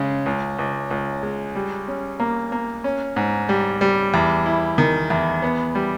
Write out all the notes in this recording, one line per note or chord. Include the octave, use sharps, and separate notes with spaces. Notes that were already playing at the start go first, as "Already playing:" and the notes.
Already playing: C#3 G#3
C#2
C#2
C#2
G#3
G3
C#4
A#3
A#3
C#4
G#2
G3
G3
E2
E4
D#3
E2
B3
G3